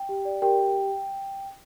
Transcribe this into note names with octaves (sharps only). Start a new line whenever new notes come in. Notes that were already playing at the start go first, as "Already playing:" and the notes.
Already playing: G5
G4
D5
G4 A#4 G5
A#4